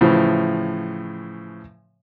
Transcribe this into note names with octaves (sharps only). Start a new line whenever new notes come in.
A2 C#3 E3 F3